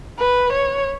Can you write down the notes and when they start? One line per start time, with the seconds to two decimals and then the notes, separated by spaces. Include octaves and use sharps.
0.19 B4
0.53 C#5